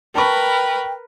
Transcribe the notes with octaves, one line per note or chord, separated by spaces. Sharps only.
A#4 B4 G5 A5 B5 C#6